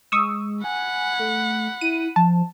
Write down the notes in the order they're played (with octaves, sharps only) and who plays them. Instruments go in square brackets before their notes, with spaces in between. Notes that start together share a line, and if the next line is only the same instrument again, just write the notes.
[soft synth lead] G#3 [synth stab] C#6 D#6 E6
[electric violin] F#5 B5 [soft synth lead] G#5
[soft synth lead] A3
[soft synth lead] E4 [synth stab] D#7
[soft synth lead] F3 [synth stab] A5